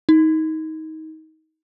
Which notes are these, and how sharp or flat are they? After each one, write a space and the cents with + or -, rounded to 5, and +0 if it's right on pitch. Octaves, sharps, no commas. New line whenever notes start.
D#4 +25